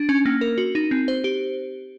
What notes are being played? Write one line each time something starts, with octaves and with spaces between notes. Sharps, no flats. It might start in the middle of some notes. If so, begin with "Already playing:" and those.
Already playing: D4
C#4
A#3
A#4
F#4
D#4
C4
C5
G4